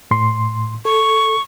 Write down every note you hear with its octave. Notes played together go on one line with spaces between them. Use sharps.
A2 C6
A4 C#6